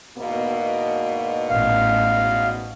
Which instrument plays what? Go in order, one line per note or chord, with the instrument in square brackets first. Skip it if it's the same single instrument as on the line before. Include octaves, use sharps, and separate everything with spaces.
[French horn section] E2 G#2 B2 [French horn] A#3
[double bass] A1 [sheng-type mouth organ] F5